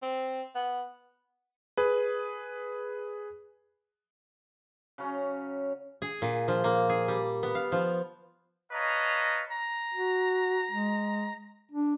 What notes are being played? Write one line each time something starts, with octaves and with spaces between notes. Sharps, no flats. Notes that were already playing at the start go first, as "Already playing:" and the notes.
C4
B3
G#4 B4
C#3 F#3 C#4
G#4
A#2
F3
A#3
G#4
G3
B3
F5
F3
B4 C#5 D#5 F5 A5 A#5
A#5
F#4
G#3
D4